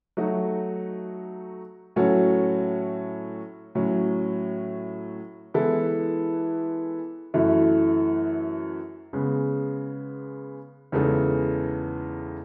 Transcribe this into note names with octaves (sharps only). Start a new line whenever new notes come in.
F#3 A3 D#4 F#4
A2 F#3 C#4 F#4 A4
A2 F#3 C#4
E3 G#3 B3 E4 A4
F#2 E3 A3 E4
C#3 G#3 B3
E2 C#3 G#3 D#4 A4